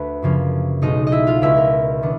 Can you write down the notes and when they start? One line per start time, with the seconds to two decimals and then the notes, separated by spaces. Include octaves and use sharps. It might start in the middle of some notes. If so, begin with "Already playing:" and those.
Already playing: D2 A3 B4
0.22 F#2 C#3 F3 A#3 C#4
0.82 B1 B2 G#3 D#4 D#5
1.07 D#5
1.12 E4 E5
1.27 F4 F5
1.42 C#2 B2 G#3 C#4 E4 E5
1.57 A#4
2.02 D#3 B3 D4